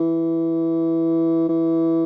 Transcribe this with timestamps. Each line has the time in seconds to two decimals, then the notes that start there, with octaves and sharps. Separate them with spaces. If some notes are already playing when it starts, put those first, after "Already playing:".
Already playing: E3
1.49 E3